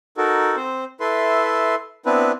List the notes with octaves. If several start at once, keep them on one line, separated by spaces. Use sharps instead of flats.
D#4 F#4 A4 A#4
C4 C5
E4 A4 B4 E5 C6
B3 C4 D4 E4 B4